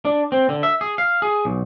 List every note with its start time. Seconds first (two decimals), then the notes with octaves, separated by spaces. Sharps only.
0.05 D4
0.32 C4
0.49 D3
0.63 E5
0.81 G#4
0.98 F5
1.22 G#4
1.45 B1